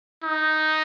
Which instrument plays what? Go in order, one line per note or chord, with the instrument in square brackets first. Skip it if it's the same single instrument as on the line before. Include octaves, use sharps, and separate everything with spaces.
[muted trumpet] D#4